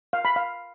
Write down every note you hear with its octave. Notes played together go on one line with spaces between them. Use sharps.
F5
B5
F5